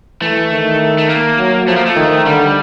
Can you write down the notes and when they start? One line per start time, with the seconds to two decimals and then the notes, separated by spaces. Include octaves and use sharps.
0.22 E3 A3
0.51 D#3
0.98 A3
1.10 A#3
1.38 F#3
1.67 F3 A3
1.76 A#3
1.86 A3
1.96 D#3
2.25 D3 G3